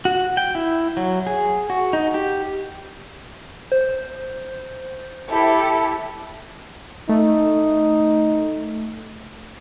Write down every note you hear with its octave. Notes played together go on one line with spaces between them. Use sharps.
F#4
G5
E4
F#3
G#4
F#4
D#4
G4
C5
E4 G4 A4
A3 D#4